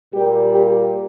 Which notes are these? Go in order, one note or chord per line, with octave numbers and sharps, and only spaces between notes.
A#2 G3 A#3 G4
G4